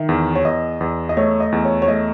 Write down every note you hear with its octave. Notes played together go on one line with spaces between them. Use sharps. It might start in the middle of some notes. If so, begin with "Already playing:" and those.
Already playing: D#3 E5
E2
C#5
E2 D#5
E2
D#5
A3 C#5
D#5
E2
C#5
C#5
A3 D#5